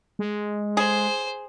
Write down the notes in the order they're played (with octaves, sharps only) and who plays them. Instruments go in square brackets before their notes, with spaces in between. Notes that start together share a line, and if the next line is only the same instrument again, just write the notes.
[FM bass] G#3
[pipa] G#4 [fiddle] C5